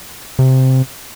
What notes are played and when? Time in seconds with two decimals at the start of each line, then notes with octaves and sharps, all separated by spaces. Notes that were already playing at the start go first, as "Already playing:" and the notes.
0.39 C3